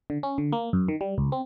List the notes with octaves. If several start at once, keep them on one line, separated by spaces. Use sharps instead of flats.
D3
C#4
D3
A#3
F#2
D#3
G3
C#2
C4